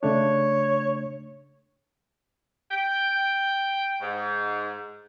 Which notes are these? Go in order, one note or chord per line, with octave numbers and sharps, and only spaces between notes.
C#3 A3 D4 C#5
G5
G#2